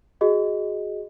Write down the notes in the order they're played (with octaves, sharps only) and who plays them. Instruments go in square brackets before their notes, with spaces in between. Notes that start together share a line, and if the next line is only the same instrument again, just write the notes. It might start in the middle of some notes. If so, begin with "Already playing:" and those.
[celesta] F#4 G#4 D#5